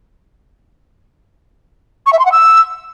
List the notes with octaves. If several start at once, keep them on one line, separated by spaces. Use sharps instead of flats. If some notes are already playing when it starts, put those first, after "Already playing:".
C#6
E5
C6
F#5
E6